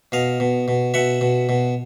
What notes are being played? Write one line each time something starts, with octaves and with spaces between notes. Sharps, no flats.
B2 D#5 F5
B2
B2
B2 E5 F#5
B2
B2